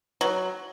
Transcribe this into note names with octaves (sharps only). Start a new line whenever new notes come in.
F#3